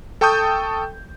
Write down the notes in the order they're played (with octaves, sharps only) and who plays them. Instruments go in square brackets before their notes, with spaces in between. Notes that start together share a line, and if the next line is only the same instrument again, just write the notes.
[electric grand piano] A4 G5 A5 C#6 D#6 G6